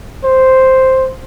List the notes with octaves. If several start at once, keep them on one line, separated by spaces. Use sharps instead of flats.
C5